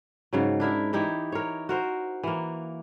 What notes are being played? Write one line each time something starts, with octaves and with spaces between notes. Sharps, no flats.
G#2 C#3 F#3
D4 E4 A#4 E5
E3 D#4 E4 G4
A#4 C#5
F#4 A#4 C5
E3 A#3